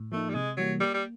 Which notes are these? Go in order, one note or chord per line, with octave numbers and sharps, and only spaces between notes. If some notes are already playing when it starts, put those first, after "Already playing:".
Already playing: A2
F3 A3 A#3 D#4
G3
C3 G#3
E3 F#3 G3 A#3
G3 A#3
G3